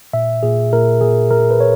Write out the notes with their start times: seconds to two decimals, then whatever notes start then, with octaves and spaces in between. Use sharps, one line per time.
0.13 A#2 E5
0.43 A#2 G#4
0.73 A#2 A#4
1.01 A#2 G#4
1.31 A#2 A#4
1.51 B4
1.61 C#5